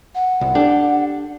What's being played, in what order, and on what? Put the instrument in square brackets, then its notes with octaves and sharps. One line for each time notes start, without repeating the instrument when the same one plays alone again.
[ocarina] F#5
[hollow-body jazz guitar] C2
D4 G4 A4